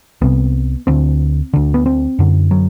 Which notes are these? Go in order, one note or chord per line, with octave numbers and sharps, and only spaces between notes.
C2 C3 B3
D2 D3 C4
D2 D3
B3
C4
F#2 D3
F#3